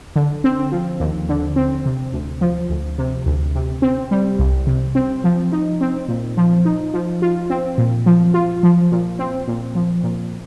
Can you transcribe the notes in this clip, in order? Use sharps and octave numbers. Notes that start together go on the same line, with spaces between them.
D3
C4
F3
D#2
D3
C4
C3
D2
F3
D2
C3
D2
C3
C4
G3
C2
C3
C4
F3
D#4
C4
A#2
F3
D#4
F3
F4
C4
A#2
F3
F4
F3
A#2
C4
A#2
F3
A#2